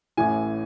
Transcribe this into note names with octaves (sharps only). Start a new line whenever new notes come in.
A1 A2 E3 G#5